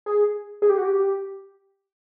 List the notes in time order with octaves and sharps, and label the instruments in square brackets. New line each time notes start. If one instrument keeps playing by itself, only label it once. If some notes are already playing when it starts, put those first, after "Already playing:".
[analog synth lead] G#4
G#4
G4
F#4
G4